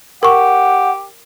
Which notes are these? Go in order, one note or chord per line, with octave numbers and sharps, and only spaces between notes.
G4 A#4 F#5 C#6